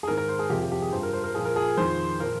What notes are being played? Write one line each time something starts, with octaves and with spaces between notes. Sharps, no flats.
G#4
G#2 D#3 A#4
A#4
C5
G#4
F2 C3 F3 G4
G4
G4
G#4
G2 F3 C5
A#4
C5
A#4
A#2 F3 G#4
A#4
G#4
F2 D#3 C5
A#2 F3 A#4